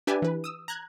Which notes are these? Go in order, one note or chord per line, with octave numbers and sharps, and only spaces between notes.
D4 G4 B4 E5 G#5 A5
E3 B4
D#6 E6
A#5 F#6 G#6